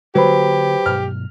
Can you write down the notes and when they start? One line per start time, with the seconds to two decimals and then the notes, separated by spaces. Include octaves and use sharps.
0.15 D3 F#3 A#3 G4 B4 C5 B5
0.86 G2 B2 F#3 F6